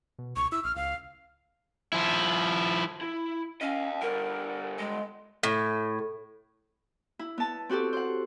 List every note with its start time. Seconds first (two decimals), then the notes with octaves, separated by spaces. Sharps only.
0.19 B2
0.36 C#2 C#6
0.52 E4 E6
0.64 A#1 F6
0.76 C#2 F5
1.93 F3 E4
3.01 E4
3.61 C#4 D#5 F5
4.01 G2 D3 A#4
4.78 G#3
5.43 A2
7.19 E4
7.38 B3 A5
7.69 C4 F#4 G4 A4
7.93 C5 F#5